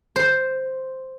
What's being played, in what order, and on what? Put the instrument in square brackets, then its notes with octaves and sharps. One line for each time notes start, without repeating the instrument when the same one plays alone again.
[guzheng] C5